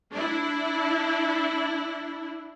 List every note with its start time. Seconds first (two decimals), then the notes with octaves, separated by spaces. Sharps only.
0.12 D4 E4